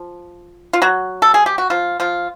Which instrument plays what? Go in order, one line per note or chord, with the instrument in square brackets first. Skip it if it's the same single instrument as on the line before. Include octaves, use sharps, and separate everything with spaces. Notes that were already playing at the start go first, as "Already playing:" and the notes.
Already playing: [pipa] F3
F4
F#3 F#4
A4
G#4
G4
F#4
F3 F4
F3 F4